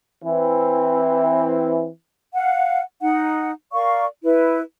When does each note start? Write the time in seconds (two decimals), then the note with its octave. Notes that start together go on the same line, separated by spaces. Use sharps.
0.24 E3 C4
2.34 F5 F#5
3.01 D#4 F#5
3.72 A#4 D5 F5 C#6
4.23 E4 B4